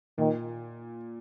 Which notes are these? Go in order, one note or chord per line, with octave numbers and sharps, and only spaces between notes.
A#2 D#3